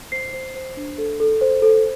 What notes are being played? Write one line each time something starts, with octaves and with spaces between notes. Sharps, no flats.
C5 C7
C5
C5
D4
A4
A4
C5
A4